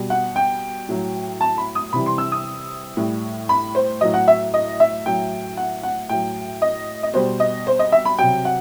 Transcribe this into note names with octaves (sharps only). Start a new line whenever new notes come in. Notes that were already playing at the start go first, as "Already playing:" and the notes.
Already playing: B2 G3
F#5
G5
A2 F#3
A5
B5
D#6
C3 E3 G3 B5
C6
E6
D#6
A2 G3
B5
C5
A2 F#3 D#5
F#5
E5
D#5
E5
A2 F#3 G5
F#5
F#5
A2 F#3 G5
D#5
D#5
B2 G3 C5
D#5
C5
D#5
E5
B5
C3 F#3 G5
F#5